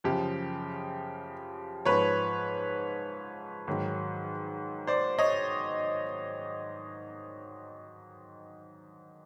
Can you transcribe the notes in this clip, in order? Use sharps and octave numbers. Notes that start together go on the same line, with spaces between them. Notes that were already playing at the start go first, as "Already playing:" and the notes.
F#2 C#3 F3 G4
G#2 F3 B4 C#5
G#2 D#3 F#3
C5 D5
C#5 D#5